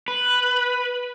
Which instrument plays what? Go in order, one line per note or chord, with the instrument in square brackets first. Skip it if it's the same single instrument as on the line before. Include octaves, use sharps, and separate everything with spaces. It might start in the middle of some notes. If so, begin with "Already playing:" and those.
[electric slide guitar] B4